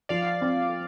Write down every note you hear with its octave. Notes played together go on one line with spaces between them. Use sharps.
F3 D5 F5
C4